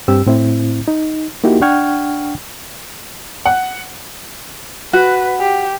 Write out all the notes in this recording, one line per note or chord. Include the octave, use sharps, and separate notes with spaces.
G2 C4 G4 E6
A2 C4 E4
D#4
A#3 D#4 E4 F#4 G4
D4 F#5 G5 C#6 F6 G#6
F#5
F#4 B4
G4